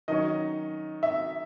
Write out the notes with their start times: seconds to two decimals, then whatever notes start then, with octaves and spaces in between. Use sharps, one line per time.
0.08 D#3 F#3 C#4 D#5
1.03 E5